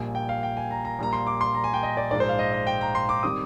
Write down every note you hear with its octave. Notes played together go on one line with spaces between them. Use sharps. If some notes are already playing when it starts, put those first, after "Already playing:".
Already playing: A#1 A#2 G3 A#3 G#5
G5
F5
G5
G#5
A#5
A#5
A#1 A#2 G3 A#3 A#5
C6
D6
C6
A#5
G#5
G5
D#5
D5
A#1 G#2 F3 G#3 D5
C5
F5
D#5
D#5
G5
A#5
C6
D6
D#3 G3 C4 D#6